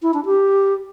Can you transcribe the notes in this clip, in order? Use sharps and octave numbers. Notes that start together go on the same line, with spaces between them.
E4
D4
G4